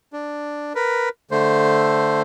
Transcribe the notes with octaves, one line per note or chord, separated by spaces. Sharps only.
D4
A#4 B4
D3 A3 C5